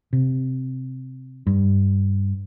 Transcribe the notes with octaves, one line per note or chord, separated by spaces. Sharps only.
C3
G2